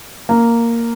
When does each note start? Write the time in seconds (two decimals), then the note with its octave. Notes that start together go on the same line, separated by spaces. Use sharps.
0.29 A#3